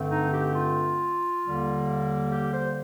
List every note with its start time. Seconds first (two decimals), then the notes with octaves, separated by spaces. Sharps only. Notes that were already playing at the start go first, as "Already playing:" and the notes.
Already playing: G2 D3 A3 C4
0.10 D#4
0.32 G4
0.54 F4
1.43 D#2 D3 G3 A#3
2.32 G4
2.53 C5